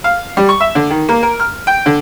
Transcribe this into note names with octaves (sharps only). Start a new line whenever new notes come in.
F5
G3
C#6
E5
D3
D#3
A#3
A#4
F6
G5
D3